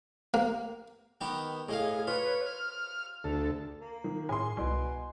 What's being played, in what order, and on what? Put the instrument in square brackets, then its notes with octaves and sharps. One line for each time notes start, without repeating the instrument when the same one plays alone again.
[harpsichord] A#3
D#3 B3 G4
[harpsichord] A2 D#5 F5 [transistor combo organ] G#4
[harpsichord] F4 [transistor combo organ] B4 C#5
[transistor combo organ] F6
D2 A4
[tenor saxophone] A#3
[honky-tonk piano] D#3
[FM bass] A2 [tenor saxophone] G#4 [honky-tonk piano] G#5 C6
[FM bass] C2 [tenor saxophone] B2